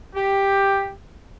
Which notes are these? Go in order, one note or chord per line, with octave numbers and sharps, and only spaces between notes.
G4